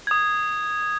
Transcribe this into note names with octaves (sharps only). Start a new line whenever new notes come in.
D#6 G#6